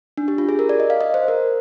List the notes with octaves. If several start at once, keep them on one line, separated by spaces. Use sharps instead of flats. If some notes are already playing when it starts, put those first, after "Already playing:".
D4
G4
F4
G#4
A#4
D5
D#5
F5
D#5
C5
A#4